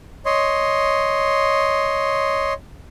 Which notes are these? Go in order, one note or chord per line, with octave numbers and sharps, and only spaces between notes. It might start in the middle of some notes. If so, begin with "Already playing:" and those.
C#5 D#5 C6